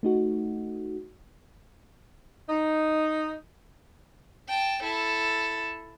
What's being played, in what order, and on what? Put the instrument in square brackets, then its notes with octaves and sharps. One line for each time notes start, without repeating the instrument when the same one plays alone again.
[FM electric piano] A3 D#4 F#4
[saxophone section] D#4
[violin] G5 A5
E4 A4